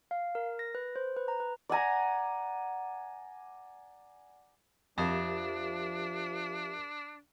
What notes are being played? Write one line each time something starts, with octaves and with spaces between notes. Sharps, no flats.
F5
A#4
A#6
B4
C5
B4
A#5
B4
D5 F#5 G#5 A#5
F2 F3 D4 G4 A#4 E5